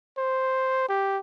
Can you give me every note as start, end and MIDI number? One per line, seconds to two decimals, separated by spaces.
0.17 0.88 72
0.89 1.19 67